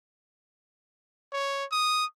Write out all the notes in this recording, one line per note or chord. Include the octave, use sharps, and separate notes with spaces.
C#5
D#6